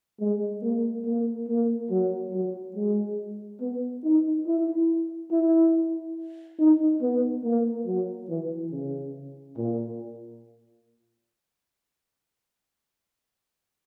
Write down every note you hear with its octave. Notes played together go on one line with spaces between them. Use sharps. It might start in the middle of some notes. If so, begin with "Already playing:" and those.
G#3
A#3
A#3
A#3
F#3
F#3
G#3
B3
D#4
E4
E4
D#4
B3
A#3
F#3
E3
C#3
A#2